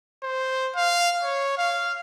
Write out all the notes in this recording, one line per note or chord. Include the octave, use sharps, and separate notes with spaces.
C5
F5
C#5
F5